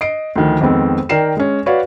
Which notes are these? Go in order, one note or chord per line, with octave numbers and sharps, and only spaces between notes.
D#5 C7 D7
D2 D#3 F3
F2 D#3 G#3 B3 C4
D#3 A#4 D5 G5 C7 E7
G#3 C#4
F#4 B4 C#5 D5 F5